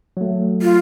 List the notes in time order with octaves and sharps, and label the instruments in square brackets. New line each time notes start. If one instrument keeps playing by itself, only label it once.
[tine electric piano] F#3 A3
[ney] F4